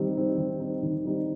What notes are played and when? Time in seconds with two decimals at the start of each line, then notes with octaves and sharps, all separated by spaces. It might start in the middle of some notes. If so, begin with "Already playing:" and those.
Already playing: D#3 G3 C4 D#4
0.15 G3 C4 D#4
0.37 D#3
0.60 G3 C4 D#4
0.83 D#3
1.05 G3 C4 D#4